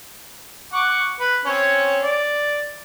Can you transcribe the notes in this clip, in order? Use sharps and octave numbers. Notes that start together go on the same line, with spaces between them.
F#5 C#6 D6
B4
C4 C#4 C#5
D5